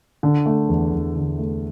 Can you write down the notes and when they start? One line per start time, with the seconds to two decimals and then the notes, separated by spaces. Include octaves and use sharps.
0.23 D3
0.46 A3
0.69 E2
0.93 E2
1.15 D3
1.38 A3